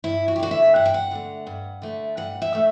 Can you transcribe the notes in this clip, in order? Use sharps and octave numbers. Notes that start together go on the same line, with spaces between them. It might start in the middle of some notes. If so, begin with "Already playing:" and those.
G2 E4
F#4
G4
D3 A3 F#4
E5
G2 F#5
G5
F#5
D3 A3
G2
D3 A3
G2 F#5
E5
D3 A3